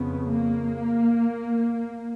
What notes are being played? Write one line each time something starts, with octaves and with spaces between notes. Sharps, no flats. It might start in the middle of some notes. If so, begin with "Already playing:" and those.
Already playing: F2 C#3 B3
A#3